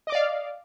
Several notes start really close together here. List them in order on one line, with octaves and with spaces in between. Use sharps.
D#5 D6 D5 F5